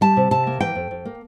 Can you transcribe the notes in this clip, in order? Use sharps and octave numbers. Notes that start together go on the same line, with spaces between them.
G3 A5
C3
C3 A5
A#3
E3 G5
F2
F2
A#3